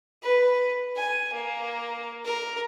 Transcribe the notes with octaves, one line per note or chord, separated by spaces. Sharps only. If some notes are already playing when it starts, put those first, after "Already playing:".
B4
G#5
A#3
A#4